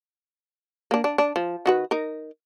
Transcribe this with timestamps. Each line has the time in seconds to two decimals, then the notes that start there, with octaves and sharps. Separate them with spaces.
0.91 A#3 D4
1.04 D4
1.18 D4
1.36 F3
1.66 D#3 F#4 B4
1.91 D#4 A#4